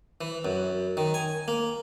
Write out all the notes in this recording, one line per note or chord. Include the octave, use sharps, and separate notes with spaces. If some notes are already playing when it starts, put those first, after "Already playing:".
E3
F#2
D#3
G#5
A#3